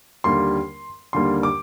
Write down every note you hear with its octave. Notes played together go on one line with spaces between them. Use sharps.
D#2 D3 G3 A#3 C6
D#2 D3 G3 A#3 C6
D6